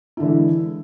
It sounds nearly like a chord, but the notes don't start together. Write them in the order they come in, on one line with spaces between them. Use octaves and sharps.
E4 D3 E3 G#3